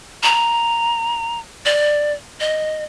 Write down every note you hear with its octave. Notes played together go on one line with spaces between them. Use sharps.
A#5
D5
D#5